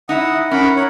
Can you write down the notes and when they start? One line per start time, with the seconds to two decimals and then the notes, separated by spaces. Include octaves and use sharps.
0.09 D#4 E4 E5 F#5 D#6
0.51 C#4 A#4 F#5 B5
0.76 C#5